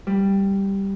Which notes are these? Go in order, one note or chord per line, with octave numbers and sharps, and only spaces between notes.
G3